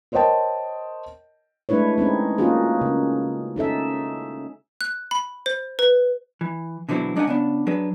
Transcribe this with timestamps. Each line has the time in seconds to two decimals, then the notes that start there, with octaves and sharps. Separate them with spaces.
0.12 A#4 C5 C#5 D#5 G5 A5
1.69 G#3 A3 D4 E4 B4 C#5
1.98 G#3 C4 C#4 D#4
2.38 A#3 C#4 D#4 F4 F#4 G#4
2.81 C#3
3.56 C#4 D#4 A4 E5
4.81 F#6
5.11 B5
5.46 C5
5.79 B4
6.41 E3
6.89 B2 D3 E3 F#3 C4 E4
7.16 G#3 D4 D#4 C#5 F#5 G#5
7.27 C#3 B3 D4
7.67 F#3 D4 G#4 B4